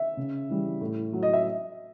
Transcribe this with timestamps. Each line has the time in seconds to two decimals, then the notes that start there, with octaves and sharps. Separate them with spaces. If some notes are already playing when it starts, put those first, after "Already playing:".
Already playing: E5
0.17 C#3
0.49 E3 G3
0.81 A2
1.13 F#3
1.23 D#5
1.33 E5